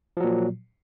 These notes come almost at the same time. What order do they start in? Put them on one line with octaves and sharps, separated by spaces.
F3 F#3 A#2